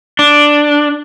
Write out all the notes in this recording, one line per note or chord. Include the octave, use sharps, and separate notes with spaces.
D4